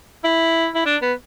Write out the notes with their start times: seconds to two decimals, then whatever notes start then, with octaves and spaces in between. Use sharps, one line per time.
0.24 E4
0.75 E4
0.86 D4
1.02 B3